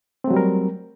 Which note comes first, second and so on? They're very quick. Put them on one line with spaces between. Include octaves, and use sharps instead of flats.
C4 A3 F#3 G3 A#4